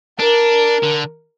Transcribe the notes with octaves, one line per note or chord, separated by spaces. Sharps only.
D4 A#4
D3